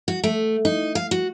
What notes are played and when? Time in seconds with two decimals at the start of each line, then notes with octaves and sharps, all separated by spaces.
0.08 F#4
0.24 A3
0.65 D#4
0.95 F5
1.11 F#4